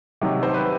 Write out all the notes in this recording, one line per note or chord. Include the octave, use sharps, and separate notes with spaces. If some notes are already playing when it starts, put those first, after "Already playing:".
C3 D#3 F#3
C5
B4